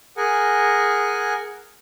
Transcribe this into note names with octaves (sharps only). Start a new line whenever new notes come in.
G#4 A#4 F#5 G#5